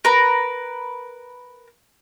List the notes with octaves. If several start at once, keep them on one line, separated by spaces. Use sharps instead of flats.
A#4 B4